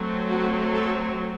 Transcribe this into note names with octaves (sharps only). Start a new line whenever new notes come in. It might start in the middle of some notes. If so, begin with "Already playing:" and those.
Already playing: F#3 A3 C4
F#4
A4